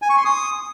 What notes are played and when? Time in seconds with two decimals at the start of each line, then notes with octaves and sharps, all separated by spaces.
0.02 G#5
0.10 C#6
0.17 C6
0.25 D#6